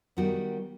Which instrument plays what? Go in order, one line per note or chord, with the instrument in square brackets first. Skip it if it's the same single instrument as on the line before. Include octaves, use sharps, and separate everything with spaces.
[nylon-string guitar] D#3 G3 B3 D#4 F#4